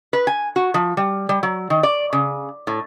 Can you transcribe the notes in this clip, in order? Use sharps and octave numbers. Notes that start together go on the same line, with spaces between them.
B4
G#5
F#4
F3
G3
G3
F#3
D#3
D5
C#3
A2